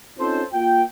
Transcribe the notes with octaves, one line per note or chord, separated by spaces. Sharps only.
C4 C#4 D#4 F4 A4 C5
A#3 F4 G5